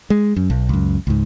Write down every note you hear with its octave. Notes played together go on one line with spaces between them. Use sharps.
G#3
F#2
B1
C#2 F#2
C#2 G#2